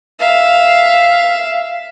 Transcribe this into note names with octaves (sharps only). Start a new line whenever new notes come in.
E5 F5